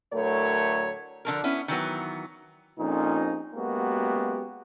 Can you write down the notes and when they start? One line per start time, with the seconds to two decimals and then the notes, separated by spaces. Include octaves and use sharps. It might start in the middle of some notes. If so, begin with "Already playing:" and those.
0.13 A2 D3 F#3 A3 A#4 C#5
1.25 D3 F3 A#4
1.44 B3 C#4 E4
1.68 D#3 E3 F#3 B3
2.79 A#1 F2 A#2 C#4 D#4
3.55 F#2 G#3 A#3 B3 F#4 G4